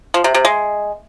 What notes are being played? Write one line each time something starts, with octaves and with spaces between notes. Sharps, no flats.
F3
C3
C3
G#3